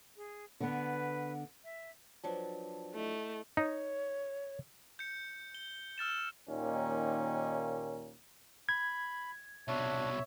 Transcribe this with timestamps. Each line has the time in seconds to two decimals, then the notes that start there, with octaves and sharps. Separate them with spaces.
0.17 G#4
0.60 D3 B3 B4
1.64 E5
2.24 F3 F#3 D4 B4 C5 A5
2.95 A3 E4 D#5
3.57 D#4 C#5
4.99 G6 C#7
5.55 G7
5.98 E6 F6 A6 E7
6.49 D#2 A#2 D#3 A#3 C#4
8.69 B5 G#6
9.68 C2 B2 D4 C#5 E5